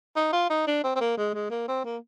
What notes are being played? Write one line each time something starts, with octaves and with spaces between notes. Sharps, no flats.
D#4
F4
D#4
D4
C4
C4
A#3
G#3
G#3
A#3
C4
A#3